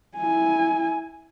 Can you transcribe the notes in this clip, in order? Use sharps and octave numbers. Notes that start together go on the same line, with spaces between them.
E4 G#5